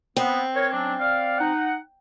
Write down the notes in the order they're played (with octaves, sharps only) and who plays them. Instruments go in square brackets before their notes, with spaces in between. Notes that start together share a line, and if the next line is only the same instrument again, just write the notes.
[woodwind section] B3 [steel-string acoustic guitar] C4
[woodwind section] A#4 C#5
F#3 C#4 D4
D5 F5
D#4 F#5